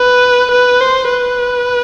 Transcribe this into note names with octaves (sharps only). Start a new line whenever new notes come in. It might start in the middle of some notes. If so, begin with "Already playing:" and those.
Already playing: B4
B4
C5
B4